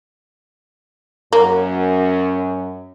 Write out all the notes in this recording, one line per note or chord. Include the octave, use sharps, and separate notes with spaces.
F#2 A#3